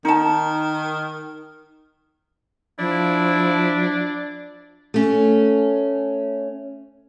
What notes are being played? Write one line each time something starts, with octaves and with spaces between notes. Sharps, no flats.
D#3 D#4 A5
F3 D4 E4
A3 C#4